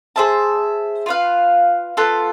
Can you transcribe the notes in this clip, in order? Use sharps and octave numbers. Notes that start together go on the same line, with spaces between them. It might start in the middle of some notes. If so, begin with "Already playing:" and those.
G#4 C5 E5 A5
F4 B4 F5
B3 F4 A4